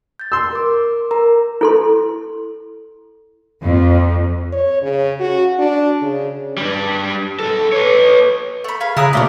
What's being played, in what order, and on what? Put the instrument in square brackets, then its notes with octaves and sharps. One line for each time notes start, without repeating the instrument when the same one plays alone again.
[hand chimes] G6 A6
[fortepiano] C6 E6
[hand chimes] A#4 D6
A#4 A#5
[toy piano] E4 A4 C6
[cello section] F2
[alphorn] C#5
C#3
F#4
D4
C#3
[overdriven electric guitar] G3 D4
B1 A4
B4 C#5
[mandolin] A3 B5
[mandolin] G#4 B5 [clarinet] F5
[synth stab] C#3 F#6 [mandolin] E4 G#5 D#6 [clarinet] A#5
[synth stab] B2 A3 B6 [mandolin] C#4 C5 D5 [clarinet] F5